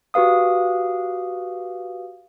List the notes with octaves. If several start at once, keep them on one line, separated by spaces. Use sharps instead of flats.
F#4 G4 B4 F5 D#6